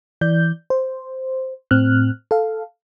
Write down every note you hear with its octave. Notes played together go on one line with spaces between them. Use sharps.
E3 D5 G6
C5
A2 C4 F6 F#6
A4 F5